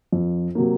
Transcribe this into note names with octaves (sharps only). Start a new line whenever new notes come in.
F2
C3 F#3 A#3